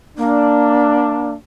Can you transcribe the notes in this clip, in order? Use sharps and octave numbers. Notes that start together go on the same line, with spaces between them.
A#3 D4